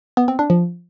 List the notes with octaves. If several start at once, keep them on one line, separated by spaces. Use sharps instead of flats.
B3
C4
D4
F3